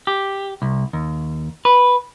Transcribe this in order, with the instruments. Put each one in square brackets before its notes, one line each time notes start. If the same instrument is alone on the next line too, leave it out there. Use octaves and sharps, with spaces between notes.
[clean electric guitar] G4
C2
D#2
B4